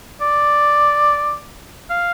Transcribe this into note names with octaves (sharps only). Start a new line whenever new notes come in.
D5
F5